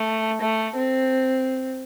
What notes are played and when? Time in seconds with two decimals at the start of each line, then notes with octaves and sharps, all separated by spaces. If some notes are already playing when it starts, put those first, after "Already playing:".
Already playing: A3
0.41 A3
0.76 C4